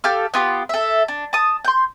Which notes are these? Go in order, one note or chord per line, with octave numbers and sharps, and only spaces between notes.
G4 A4 F5 F6
B3 F4 G4
A4 E5
D4
A5 D#6
C6 G6